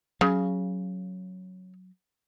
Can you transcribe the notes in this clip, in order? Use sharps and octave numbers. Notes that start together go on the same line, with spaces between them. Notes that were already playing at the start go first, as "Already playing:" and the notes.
C#3 F#3